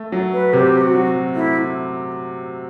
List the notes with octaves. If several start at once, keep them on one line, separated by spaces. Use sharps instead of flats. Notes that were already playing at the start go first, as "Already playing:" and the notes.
Already playing: A3
F#3
B4
C3 G4
F#4
F#3
A3 E4